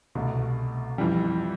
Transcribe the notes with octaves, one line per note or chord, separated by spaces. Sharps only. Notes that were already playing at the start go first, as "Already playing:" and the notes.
C2 B2 A3
F2 E3 G3